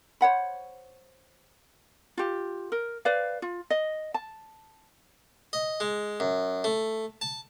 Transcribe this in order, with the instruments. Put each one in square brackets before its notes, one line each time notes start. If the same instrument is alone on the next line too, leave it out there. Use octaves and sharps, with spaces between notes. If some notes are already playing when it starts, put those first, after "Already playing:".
[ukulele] C5 C#5 F#5 B5
F4 G4
A#4
B4 C5 D5 F5
F4
D#5
A5
[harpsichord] D#5
G#3
F#2
A3
A5